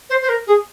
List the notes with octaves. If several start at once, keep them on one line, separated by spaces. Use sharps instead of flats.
C5
C5
A#4
G#4